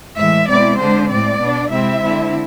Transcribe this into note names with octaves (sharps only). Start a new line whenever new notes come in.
A2 E3 G#3 E5
B2 G#3 C4 E4 D5
D3 G#3 D4 C5
A2 G#3 C4 D5
B2 B3 D4
C3 G#3 C4 E4 E5
D3 G#3 C4 E4